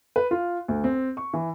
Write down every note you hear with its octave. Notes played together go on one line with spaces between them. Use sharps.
B4
F4
D2
C4
C#6
E3